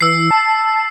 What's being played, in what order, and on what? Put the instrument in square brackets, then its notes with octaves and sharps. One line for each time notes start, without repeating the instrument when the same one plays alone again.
[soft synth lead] E3 [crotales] E6 C7
[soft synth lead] A5